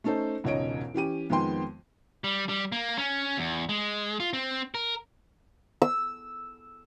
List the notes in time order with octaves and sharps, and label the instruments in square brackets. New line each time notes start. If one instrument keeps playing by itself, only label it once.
[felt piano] A3 C#4 D#4 A4 C5
E1 C#2 G#2 C#5 D#5 D7
E3 C#4 G4 D#7
F2 D#3 G#3 B3 G5 C6
[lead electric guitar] G3
G3
A#3
C#4
E2
G#3
F4
C4
A#4
[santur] E6